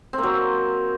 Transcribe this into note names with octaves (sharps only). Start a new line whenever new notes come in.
C4
A#3
F#3